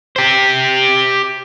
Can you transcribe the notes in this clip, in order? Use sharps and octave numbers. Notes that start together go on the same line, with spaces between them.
G4 C5